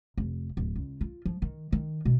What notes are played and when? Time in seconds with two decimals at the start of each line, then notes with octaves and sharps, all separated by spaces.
0.18 F1
0.57 D1
0.76 C#2
1.01 F4
1.25 F3
1.42 D#3
1.72 D#3
2.05 B2